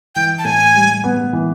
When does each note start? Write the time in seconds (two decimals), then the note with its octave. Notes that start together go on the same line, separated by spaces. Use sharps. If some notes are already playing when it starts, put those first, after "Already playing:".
0.15 E3 G5
0.39 A5
0.45 A2 G#5
0.75 G3
1.04 B3
1.33 E3